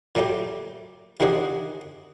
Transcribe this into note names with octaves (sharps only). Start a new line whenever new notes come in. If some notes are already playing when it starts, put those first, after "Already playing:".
A#2 F#3 G3 A3 G4
C3 D#3 F3 D4 F#4 G#4